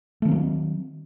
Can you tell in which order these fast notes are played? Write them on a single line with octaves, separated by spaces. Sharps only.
A3 D#3 C4 F#3